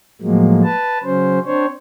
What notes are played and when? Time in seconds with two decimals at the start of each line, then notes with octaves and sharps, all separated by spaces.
0.22 A2 F3 F#3 G#3 A#3
0.64 B4 A5
1.04 C#3 F#3 C#4 C5
1.45 C4 D4 C5 C#5